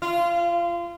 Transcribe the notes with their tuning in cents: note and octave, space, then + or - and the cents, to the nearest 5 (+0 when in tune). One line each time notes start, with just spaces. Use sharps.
F4 -25